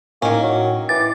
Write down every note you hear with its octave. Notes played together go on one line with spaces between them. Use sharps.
A2 D#3 A#3 C#4
F#3
E3 D6 A6